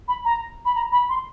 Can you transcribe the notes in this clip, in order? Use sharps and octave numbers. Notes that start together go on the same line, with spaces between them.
B5
A#5
B5
A#5
B5
C6